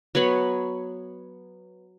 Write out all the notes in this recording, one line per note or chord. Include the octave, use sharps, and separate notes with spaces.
F#3 B3 C#5 B5